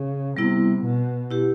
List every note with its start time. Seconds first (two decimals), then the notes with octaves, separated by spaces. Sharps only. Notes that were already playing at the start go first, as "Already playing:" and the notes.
Already playing: C#3
0.37 C3 G3 B3 E4
0.84 B2
1.31 E4 G4 B4